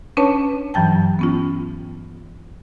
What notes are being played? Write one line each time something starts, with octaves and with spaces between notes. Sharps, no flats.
C#4 D4 B4 C#5 A5
G2 E3 F#3 G5 A5
B3 C#4 F4